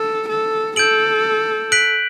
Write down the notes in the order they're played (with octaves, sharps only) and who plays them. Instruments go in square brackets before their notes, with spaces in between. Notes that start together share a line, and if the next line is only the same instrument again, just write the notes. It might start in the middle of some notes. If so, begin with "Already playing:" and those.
Already playing: [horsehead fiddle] A4
A4
[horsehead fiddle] A4 [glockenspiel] G6 D7 F#7
[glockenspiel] F#6 B6 D7 F#7